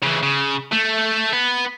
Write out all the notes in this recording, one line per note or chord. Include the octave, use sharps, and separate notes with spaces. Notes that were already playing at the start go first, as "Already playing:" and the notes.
C#3 E3
C#3
A3
B3